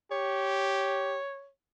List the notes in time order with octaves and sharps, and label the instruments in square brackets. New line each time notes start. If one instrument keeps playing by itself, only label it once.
[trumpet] G4 [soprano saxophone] C#5